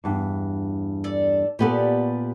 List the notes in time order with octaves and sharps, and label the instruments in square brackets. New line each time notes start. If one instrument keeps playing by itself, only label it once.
[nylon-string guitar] E2 G2
[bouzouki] A4 D5
[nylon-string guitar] A#2 B3 A4 [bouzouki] G4 B4 D5